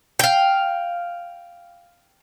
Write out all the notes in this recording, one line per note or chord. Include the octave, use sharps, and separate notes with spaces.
F5 G5